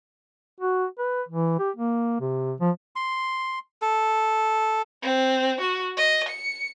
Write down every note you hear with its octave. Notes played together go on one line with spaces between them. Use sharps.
F#4
B4
E3
G4
A#3
C3
F3
C6
A4
C4
F#4
D#5
C#7